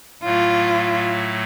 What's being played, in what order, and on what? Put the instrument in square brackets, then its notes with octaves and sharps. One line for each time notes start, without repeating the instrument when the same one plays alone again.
[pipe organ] A2 F#3 A3 [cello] F4